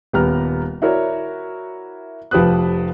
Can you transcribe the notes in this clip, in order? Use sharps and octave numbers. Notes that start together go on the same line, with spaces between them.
D#1 G3 B3 G4 A#5 F6
E4 F#4 A#4 C#5 D5
F1 F3 G4 B4 D#6 F#6